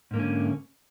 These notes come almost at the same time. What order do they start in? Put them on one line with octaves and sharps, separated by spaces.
G#2 A#3 D3 C#4